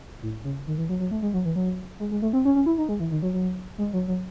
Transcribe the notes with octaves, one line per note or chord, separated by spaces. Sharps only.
A2
C#3
D#3
E3
F#3
F#3
A3
G#3
F#3
E3
F#3
G#3
G#3
A3
C4
C#4
C#4
E4
D#4
G#3
E3
D#3
F#3
F#3
G#3
F#3
F#3